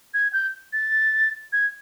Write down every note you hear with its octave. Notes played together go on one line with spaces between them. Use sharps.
G#6
G6
A6
G#6